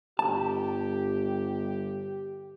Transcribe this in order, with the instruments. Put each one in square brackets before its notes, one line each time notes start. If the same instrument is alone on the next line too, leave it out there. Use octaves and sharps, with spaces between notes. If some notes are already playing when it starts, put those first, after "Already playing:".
[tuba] G1 [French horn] G4 [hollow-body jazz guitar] A5